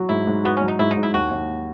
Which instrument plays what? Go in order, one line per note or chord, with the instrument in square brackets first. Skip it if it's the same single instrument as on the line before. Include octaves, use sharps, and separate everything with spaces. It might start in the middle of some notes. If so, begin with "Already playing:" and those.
Already playing: [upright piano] F#3 F#4
[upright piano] G#2 [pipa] E4
[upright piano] G#2
[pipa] B3 [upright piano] F#4
[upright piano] F#3 [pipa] C#4
[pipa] D#4
[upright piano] G#2 [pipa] E4
[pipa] D#4
[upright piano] G#2
[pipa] E4
[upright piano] D#2 [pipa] F#4
[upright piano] D#2